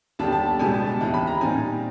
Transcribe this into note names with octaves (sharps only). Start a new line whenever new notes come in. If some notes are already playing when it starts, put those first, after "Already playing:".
D#2 D3 G3 B3 D4 A5
A5
A5
C#2 B2 G3 B3 D4 G#5
A5
A5
D#2 C#3 E3
B5
A#5
A#2 G3 C4 D#4 G#5